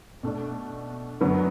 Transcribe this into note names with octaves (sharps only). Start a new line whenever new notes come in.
B2 A3 D4
F#2 D3 F#3 B3